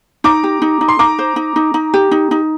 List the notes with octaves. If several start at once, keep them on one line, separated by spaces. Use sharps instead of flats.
D#4 A#5 D6
G4
D#4
D#4
C6
D#4 A#5 D6
C5
D#4
D#4
D#4
G4
D#4
D#4